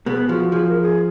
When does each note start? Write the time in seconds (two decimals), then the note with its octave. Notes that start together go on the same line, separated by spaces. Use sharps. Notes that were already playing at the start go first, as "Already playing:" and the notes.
0.06 B2 B3 G#4
0.29 F3 F#4
0.52 F3 G#4
0.68 A#4
0.82 G#4